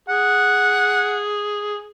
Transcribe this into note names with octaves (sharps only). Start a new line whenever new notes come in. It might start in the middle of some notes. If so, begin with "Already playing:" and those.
G#4 F#5